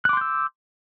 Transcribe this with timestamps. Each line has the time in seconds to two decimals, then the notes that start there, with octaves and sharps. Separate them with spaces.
0.05 F#6
0.09 D6
0.13 C6
0.17 G6
0.21 E6